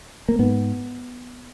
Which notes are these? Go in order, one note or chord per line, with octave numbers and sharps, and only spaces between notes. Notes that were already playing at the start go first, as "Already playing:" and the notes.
A#3
G#2 B3